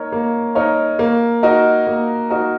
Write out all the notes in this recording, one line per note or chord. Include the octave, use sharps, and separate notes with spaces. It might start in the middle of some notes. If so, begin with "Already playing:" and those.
Already playing: A#3 D#4 A#4 C#5
A#3
D#4 A#4 C#5
A#3
D#4 F#4 A#4 D#5
A#3
D#4 F#4 A#4 D#5